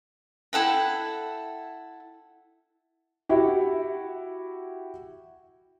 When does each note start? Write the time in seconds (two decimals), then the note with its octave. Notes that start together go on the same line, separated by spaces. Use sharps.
0.53 E4 A4 F#5 G5
3.29 E4 F#4 G4